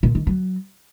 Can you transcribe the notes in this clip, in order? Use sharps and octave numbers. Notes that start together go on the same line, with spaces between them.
A#2
D#3
F#3